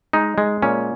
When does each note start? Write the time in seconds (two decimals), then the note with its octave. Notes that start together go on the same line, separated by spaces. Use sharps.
0.13 G#3 D#4
0.38 G#3
0.62 A#2 C#4